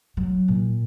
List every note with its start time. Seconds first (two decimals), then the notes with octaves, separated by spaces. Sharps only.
0.17 F#3
0.48 A#2